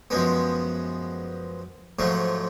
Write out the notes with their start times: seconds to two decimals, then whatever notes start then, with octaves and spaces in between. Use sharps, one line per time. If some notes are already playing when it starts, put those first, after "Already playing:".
0.10 F#2 F3 G#3 B3
1.99 G#2 F3 F#3 A3